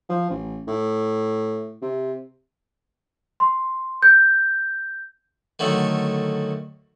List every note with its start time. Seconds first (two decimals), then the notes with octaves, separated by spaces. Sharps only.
0.09 F3
0.30 A1
0.68 A2
1.82 C3
3.40 C6
4.03 G6
5.59 D3 D#3 F#3 A3